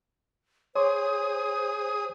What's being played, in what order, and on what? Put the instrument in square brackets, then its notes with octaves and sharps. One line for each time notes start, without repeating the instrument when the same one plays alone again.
[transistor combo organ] G#4 D#6 [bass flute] C5 [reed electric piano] C#5 C6 D6